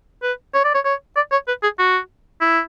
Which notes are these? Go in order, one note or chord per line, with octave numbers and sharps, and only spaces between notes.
B4
C#5
D5
C#5
C#5
D5
C#5
B4
G#4
F#4
E4